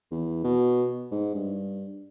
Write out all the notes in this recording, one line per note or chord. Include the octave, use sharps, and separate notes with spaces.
E2
B2
G#2
G2